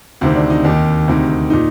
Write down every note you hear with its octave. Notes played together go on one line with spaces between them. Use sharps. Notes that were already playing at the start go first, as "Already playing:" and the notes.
D2 C3 D#3 C4
D4
D#4
D#2 D#3
D2 C3 D#3
A#2 D#4